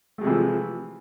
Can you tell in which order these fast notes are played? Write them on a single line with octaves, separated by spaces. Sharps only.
A3 G#3 C3 E3 F3